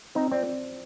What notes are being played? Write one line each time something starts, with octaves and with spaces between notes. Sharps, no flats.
C4 D#4
C4 D5